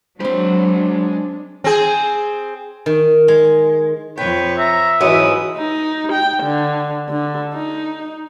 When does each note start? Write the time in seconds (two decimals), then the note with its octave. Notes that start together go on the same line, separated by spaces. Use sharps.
0.20 F#3 G#3 C4 D4 C5 B5
1.64 C4 G#4
2.86 D#3
3.28 G#3
4.18 F2 B4 C#5 G5
4.58 E5 A#5
5.01 G#2 E3 F#3 C#4 E4 B4 D#6
5.57 D#4
6.13 G5
6.44 D3
7.09 D3
7.54 D#4